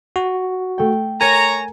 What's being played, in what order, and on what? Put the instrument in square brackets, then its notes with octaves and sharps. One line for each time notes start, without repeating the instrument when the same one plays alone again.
[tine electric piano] F#4
[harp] A3 G5
[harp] A#4 [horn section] C#5 A#5 [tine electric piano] G#5